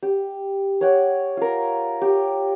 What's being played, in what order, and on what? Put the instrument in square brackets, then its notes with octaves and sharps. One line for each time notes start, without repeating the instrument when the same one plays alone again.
[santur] G4
C#5 D5 F#5 G5
F4 A#4
G4 G5